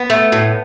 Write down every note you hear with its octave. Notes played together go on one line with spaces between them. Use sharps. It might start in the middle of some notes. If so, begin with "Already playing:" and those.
Already playing: B3
A3
A2